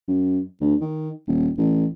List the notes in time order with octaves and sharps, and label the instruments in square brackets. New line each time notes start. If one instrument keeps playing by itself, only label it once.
[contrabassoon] F#2
D2
D#3
D#1
A1